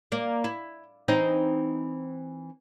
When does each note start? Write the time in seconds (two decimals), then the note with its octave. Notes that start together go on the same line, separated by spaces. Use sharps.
0.12 A#3 D5
0.44 E4
1.08 E3 C4 D#4